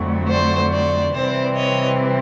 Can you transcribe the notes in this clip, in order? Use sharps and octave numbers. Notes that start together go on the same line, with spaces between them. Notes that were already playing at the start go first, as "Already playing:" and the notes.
Already playing: F2 D3 F#3 A3
C5 D5
C5 D5
C3 E3 G3 C4 C5 D5
C#5 D#5